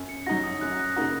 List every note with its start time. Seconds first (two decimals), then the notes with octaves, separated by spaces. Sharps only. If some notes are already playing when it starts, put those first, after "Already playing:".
Already playing: F#2
0.09 C#7
0.26 F#3 D#4 F#4 A#6
0.44 D#6
0.61 F#2 F#6
0.79 F#6
0.96 C#3 A#3 D#4 F#4 D#6